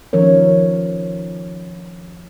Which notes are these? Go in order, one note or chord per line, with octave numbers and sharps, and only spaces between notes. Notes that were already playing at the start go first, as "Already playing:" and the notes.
D#3 F3 C#4 A#4 C#5